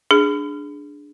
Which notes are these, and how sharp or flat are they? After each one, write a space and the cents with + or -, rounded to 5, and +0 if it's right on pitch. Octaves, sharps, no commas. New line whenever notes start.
D4 +0 G#4 +0